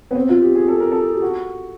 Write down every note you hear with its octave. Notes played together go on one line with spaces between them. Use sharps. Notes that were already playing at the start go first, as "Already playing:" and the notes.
B3
C4
F4
G4
G#4
A4
A#4
A4
G4
F#4